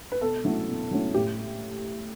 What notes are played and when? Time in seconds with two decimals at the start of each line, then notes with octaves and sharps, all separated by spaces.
0.12 B4
0.21 B2 A4
0.45 F#3 A3 C#4 E4
0.68 B2
0.91 F#3 A3 C#4 E4
1.14 A2 G4